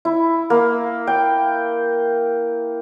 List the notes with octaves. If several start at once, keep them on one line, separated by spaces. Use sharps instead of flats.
E4
A#3
G5